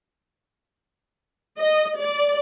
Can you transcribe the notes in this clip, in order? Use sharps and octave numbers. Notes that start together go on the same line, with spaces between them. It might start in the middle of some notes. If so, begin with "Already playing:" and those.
D#5
D5